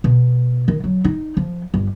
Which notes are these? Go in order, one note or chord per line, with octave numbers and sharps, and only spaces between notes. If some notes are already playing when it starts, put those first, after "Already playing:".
B2
D#3
F#3
D#4
F3
G1